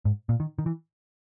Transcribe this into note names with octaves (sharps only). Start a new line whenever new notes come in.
G#2
A#2
D#3
D#3
E3